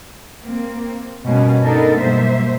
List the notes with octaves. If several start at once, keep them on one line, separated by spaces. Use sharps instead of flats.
A#3 C4
G2 B2 A#3 C#4
B3 D4 D#4 A4 A#4
G2 B2 F#3 A#3 C5 E5